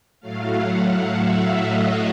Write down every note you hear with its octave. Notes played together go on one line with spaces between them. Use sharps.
A2 F#3 A3 F5
F#5
E5
D#5